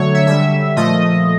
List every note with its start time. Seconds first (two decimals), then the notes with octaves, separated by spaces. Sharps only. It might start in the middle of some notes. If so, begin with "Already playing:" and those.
Already playing: D3 F#3 A3 C#5
0.14 E5
0.27 D3 G3 E5
0.76 A#2 F3 A3 D#5